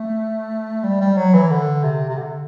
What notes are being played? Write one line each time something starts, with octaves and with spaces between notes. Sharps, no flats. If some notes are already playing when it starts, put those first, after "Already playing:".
Already playing: A3
G3
G3
F#3
E3
D3
C3
C3
D3